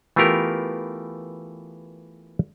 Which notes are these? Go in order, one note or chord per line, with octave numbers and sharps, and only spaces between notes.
E3 A3 B3 F4 G4 A#4